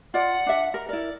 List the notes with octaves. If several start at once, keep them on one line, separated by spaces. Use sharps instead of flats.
F4 D5 F#5
D4 E5
A#4
E4 A#4 D5